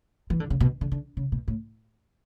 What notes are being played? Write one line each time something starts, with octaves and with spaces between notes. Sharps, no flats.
E3
D3
C#3
B2
D3
D3
C#3
B2
A2